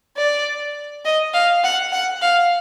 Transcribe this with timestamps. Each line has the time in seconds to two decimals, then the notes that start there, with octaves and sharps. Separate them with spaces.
0.17 D5
1.05 D#5
1.34 F5
1.64 F#5
1.92 F#5
2.22 F5